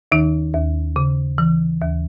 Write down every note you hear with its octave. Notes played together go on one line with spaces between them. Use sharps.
D#2 D#3 D#4
D#2
C#3
E3
D#2